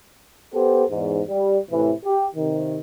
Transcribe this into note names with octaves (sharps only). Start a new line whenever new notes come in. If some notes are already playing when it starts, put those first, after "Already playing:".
B3 G4 A4 C5
E2 G#2
G3
A2 C3 E3
G4
C3 D#3